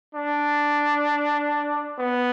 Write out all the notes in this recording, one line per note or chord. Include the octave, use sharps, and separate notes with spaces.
D4
B3